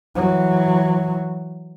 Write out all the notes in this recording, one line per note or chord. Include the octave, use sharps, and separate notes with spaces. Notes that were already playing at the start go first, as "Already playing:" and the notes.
E3 F#3